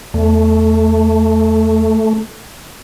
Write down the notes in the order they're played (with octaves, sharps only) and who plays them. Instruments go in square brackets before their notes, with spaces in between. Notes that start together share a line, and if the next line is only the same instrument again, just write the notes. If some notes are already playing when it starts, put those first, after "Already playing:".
[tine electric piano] E2 [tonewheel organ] A3